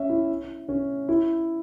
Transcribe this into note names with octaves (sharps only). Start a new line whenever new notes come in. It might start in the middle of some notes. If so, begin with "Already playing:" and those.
Already playing: C#4 E5
E4
C#4
E4